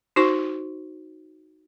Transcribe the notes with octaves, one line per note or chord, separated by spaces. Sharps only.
D#4 F#4 C5 C#6